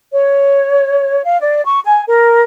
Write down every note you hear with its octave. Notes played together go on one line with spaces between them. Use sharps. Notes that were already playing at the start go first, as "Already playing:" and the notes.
C#5
F5
D5
C#6
G#5
A#4